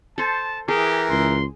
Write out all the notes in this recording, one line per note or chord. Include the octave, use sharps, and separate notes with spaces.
A4 C5 A5
E3 G4 G#4 A#4
C#2 C6